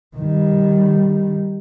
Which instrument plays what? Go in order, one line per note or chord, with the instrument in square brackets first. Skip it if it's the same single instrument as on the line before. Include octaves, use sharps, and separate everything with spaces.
[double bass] D#3 G3